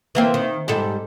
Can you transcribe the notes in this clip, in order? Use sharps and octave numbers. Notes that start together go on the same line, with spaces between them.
E3 A#3 C4
D#3
G#2 G3 A4